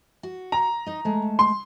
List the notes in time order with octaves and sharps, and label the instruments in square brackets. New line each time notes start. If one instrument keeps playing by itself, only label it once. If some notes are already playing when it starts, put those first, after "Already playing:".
[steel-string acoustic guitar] F#4
[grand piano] A#5
[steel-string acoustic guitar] D#4 D#5
G#3 A3
[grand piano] C6